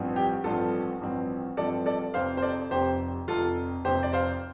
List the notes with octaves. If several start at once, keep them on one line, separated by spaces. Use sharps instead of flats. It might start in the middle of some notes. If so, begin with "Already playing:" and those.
Already playing: A1 G2 F3 C4
G4
A1 G2 F3 C4 F4 A4
A1 G2 F3 C4
A1 G2 F3 C4 A4 D5
A4 D5
F1 F2 C3 C5 F5
C5
A4 D5
F1 F2 C3 G4 C5
F1 F2 C3 F4 A4
F1 F2 C3 G4 C5
D5
C5 F5